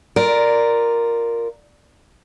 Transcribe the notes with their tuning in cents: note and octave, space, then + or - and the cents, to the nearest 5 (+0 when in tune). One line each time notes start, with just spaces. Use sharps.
F4 +0 A#4 +0 D5 +0